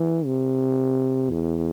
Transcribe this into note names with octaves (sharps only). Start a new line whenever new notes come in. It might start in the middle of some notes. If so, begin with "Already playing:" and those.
Already playing: E3
C3
E2